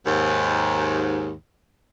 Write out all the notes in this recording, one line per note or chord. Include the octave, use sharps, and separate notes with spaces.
D#2 G#2